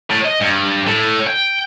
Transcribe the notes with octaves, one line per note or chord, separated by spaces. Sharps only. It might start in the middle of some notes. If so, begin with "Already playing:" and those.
A2
D#5
G2
A2
G5